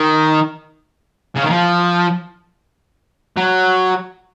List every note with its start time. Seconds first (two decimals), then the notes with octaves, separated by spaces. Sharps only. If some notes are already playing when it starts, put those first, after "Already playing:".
Already playing: D#3
1.35 C#3
1.43 D#3
1.50 F3
3.37 F#3